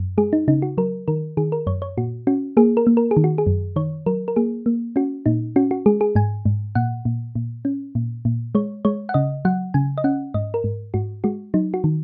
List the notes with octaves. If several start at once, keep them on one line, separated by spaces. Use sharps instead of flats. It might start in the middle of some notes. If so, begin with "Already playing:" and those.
Already playing: F#2
G#3 G#4
D#4
C#3 D#4
F#4
F#3 A#4
D#3 A#4
D#3 G#4
A#4
F#2 C#5
C#5
A#2 F#4
C#4 F#4
A#3 G#4
A#4
A#3
A#4
G#4
D#3
F#4
G#4
F#2
D#3 C#5
F#3 A#4
A#4
A#3 G#4
A#3
C#4 F#4
A#2 D#4
C#4 F#4
F#4
G#3 G#4
G#4
G#2 G#5
G#2
A#2 F#5
A#2
A#2
C#4
A#2
A#2
G#3 C#5
G#3 C#5
F#5
C#3 D#5
F#3 F#5
C#3 G#5
D#5
C#4 F#5
G#2 D#5
A#4
G#2
G#2 F#4
G#3 F#4
F#3 D#4
F#4
D#3